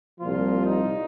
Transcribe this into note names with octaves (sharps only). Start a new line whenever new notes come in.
C2 A#2 F3 F4
D#4